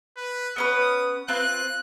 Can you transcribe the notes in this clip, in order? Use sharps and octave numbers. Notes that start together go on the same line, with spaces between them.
B4
B3 C#4 B4 D#6
C4 F4 B4 F#6